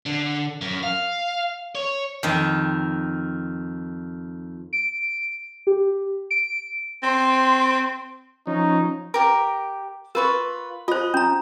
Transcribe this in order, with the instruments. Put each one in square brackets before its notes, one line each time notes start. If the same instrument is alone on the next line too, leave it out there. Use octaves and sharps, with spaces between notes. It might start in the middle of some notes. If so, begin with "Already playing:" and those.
[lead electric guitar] D3
F#2
F5
C#5
[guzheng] F2 D#3
[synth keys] D7
G4
D7
[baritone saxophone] C4 [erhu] C6
[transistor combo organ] F3 C#4 [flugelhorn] D#4
[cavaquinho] G4 A#4
[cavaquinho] F4 B4 C#6 [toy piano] A#4
[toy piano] F4 C5 [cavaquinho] D#5
[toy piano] C#4 A#5